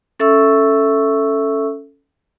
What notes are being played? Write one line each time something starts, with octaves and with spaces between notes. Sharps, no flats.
C#4 A4 E5 C#6 E6